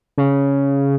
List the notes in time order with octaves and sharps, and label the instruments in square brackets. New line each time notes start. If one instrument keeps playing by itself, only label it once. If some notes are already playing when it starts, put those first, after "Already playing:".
[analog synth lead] C#3